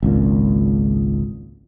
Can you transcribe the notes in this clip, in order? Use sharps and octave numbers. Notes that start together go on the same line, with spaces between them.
G#1 C#2 A#2